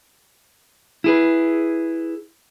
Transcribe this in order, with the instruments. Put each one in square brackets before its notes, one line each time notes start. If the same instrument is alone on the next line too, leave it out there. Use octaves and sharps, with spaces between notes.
[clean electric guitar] E4 G#4 B4